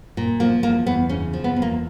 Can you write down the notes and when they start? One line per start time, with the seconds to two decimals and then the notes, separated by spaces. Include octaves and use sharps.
0.17 A#2
0.40 F3 A#3
0.63 E2 A#3
0.87 E2 B3
1.09 C#3 C#4
1.33 F3
1.44 B3
1.56 E2
1.62 A#3